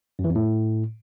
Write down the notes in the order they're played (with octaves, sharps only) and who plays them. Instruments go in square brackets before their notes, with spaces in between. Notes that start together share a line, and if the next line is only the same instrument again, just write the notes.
[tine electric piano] F#2
E3
F2
A2